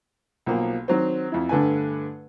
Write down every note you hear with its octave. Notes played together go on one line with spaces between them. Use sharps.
B1 F3 A#3
D#3 F#3 C4
F2 E4
G2 D3 A3 B4 G#5